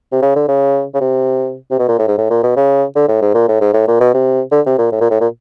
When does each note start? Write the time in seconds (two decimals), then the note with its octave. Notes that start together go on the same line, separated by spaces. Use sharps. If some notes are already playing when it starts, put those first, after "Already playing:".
0.12 C3
0.22 C#3
0.35 D3
0.48 C#3
0.94 C#3
1.01 C3
1.71 C3
1.79 B2
1.88 A#2
1.99 A2
2.07 G#2
2.18 A2
2.30 A#2
2.43 B2
2.56 C#3
2.96 D3
3.08 A2
3.22 G#2
3.34 A#2
3.48 A2
3.60 G#2
3.73 A2
3.88 A#2
4.00 B2
4.14 C3
4.52 D3
4.66 C3
4.78 A#2
4.92 A2
5.00 A#2
5.10 A2
5.21 A#2